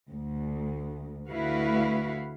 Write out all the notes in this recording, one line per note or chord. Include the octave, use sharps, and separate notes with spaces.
D2
D2 E4 F#4 B4 F5